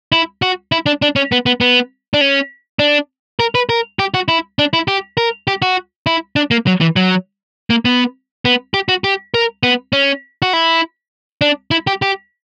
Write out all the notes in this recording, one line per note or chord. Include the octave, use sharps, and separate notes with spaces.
E4
F#4
E4
D4
D4
C#4
B3
B3
B3
D4
C#4
D4
A#4
B4
A#4
G4
F#4
E4
D4
E4
G4
A#4
G4
F#4
E4
D4
A#3
F#3
E3
F#3
A#3
B3
B3
G4
F#4
G4
A#4
B3
C#4
F#4
E4
D4
E4
G4
G4